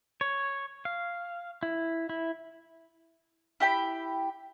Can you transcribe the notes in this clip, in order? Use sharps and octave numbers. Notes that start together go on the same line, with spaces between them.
C#5
F5
E4
E4
E4 G4 G5 B5